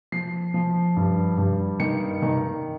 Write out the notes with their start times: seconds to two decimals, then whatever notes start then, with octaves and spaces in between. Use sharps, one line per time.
0.12 F3 C7
0.54 F3
0.96 G2
1.38 G2
1.80 D#3 C#7
2.22 D#3